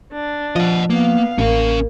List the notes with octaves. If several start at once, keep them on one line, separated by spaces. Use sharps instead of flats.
D4
F3 D#5 F#5
A#3 B3 F5
A1 A#3 C#4 F5